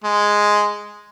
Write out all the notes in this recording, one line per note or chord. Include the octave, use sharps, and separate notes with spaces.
G#3